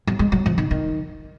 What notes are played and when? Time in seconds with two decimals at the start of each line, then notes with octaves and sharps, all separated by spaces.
0.07 F#3
0.19 G#3
0.32 F#3
0.46 F3
0.58 D#3
0.71 D#3